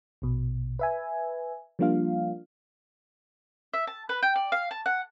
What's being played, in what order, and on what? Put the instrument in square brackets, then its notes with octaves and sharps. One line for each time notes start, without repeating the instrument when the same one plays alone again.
[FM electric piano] A#1 B2
B4 E5 G#5
F3 G3 A#3 D4 F4 F5
[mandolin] E5
A5
B4
G5
D5
F5
A5
F#5